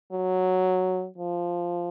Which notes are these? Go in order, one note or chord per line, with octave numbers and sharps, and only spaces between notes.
F#3
F3